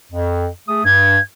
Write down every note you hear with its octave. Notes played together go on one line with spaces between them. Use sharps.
F2
A3 G#4 D#6
G2 G#6